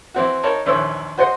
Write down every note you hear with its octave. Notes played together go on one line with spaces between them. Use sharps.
E3 C4 F#4
D#4 A#4 C#5 A5 B5
A#1 D#2 E3 C5 C#5 E6
F#4 C5 D#5 F#5 C6